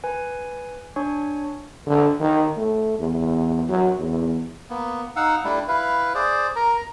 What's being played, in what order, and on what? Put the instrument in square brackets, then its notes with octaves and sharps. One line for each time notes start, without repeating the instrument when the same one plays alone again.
[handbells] B4 G#5
D4 C#5 G#5 C#6
[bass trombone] D3
D#3
A3
E2
F#3
E2
[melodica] A#3 B3
D#4 F5 F#5 E6
G3 A3 D4 E4
E4 B4 F5
G#4 C5 D5
A#4 A#5